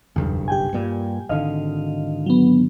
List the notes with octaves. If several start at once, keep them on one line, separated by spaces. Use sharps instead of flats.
F#1 B1 E2 G2
G4 G5 G#5
G2 A#2 G3
G#1 D3 D#5 F5
F#3 B3